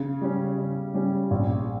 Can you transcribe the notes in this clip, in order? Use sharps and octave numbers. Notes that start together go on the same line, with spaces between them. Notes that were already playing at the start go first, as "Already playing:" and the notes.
Already playing: C#3
G3 C#4
C#3
G3 C#4
A#1